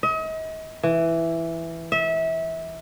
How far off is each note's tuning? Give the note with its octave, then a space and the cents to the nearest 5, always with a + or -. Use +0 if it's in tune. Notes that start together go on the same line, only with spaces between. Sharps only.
D#5 +40
E3 +5
E5 -25